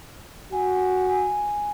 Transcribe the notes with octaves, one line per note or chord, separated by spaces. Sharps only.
F#4 G#5
G#5